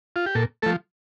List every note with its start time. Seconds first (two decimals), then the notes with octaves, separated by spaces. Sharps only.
0.16 F4
0.26 G4
0.35 A#2 A4
0.62 F3 A3 A4